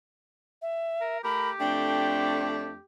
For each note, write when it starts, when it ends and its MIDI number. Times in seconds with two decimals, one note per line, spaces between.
0.62 1.18 76
1.01 1.23 70
1.24 1.53 57
1.24 2.85 67
1.24 1.53 70
1.24 1.50 83
1.60 2.75 41
1.60 2.75 57
1.60 2.75 62
1.60 2.47 79